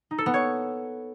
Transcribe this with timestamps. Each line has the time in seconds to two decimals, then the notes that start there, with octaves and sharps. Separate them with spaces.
0.11 D#4
0.18 A4
0.26 B3
0.34 C#5